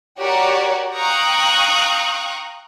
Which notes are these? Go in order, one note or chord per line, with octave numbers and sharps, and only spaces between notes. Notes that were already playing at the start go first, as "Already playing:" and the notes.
F#4 G4 A#4 C#5 D5 F#5
F5 G5 A#5 C#6 D#6 F#6